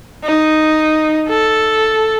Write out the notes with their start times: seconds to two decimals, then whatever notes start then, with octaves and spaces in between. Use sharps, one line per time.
0.25 D#4
1.29 A4